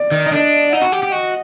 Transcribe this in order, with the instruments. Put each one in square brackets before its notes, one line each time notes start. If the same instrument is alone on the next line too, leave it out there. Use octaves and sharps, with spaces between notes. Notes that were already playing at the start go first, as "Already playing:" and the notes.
Already playing: [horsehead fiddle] D5
[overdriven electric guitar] D#3
D#4
[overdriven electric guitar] D4 [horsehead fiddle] D#5
[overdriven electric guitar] D#4 [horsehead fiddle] F#5
[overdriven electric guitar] F#4
G4
G4
[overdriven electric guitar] F#4 [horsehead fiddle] D#5